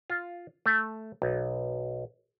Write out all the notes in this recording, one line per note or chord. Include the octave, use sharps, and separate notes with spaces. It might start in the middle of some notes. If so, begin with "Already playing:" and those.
F4
A3
B1